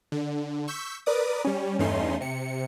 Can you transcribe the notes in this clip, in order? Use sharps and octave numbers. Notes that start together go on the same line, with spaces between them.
D3
C#6 E6 G6 B6
A#4 B4 D5 D6 D#6
G3 C#4
E2 G2 A3 C#4 D#4 C6
C3 C#7